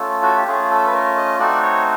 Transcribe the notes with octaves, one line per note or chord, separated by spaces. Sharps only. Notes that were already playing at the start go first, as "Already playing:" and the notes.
Already playing: A3 C#4 F4 A4
F#4
G4
A3 C#4 F4 G#4
A4
B4
A#4
D#5
A3 C4 D#4 F#4 D5
C#5